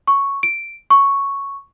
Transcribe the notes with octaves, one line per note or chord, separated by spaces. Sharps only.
C#6
D7
C#6